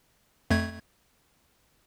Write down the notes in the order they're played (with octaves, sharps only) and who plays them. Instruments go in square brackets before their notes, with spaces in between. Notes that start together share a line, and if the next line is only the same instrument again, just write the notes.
[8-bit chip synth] F2 A3 G#6